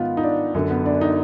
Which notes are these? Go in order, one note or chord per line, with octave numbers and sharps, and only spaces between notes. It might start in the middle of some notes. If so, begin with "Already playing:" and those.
Already playing: G#2 D#3 B3 F4
D#4
D4
F#2 D3
B3
D4
D#4